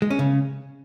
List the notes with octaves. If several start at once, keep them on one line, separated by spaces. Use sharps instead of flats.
G#3
C#4
C#3